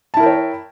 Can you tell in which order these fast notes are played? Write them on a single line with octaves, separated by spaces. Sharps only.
A5 E4 A#4 G5 C#5